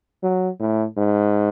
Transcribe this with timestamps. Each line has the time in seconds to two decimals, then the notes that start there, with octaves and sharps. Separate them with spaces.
0.23 F#3
0.60 A2
0.97 G#2